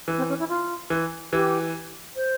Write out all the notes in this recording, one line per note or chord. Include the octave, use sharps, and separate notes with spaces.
E3
C4
C#4
E4
F4
E3
E3 G4
C5